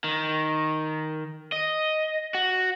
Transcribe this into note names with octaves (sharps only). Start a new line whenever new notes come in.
D#3
D#5
F#4